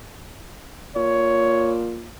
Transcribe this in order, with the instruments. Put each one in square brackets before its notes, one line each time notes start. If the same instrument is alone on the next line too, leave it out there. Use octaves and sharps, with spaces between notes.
[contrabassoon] A#2 [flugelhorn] C#5